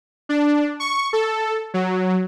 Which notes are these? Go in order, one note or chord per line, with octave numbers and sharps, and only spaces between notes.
D4
C#6
A4
F#3